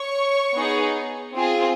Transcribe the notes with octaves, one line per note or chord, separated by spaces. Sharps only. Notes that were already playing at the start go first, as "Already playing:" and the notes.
Already playing: C#5 C#6
B3 D#4 G#4
C4 F4 G#4